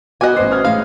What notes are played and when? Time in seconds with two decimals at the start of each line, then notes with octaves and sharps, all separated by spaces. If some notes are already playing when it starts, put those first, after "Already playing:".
0.21 B3 F#4 D#5 G#5 D6 F#6
0.36 A1 B4 C5 C7
0.51 D#6 F6 G#6
0.65 A2 G#3 C#4 F5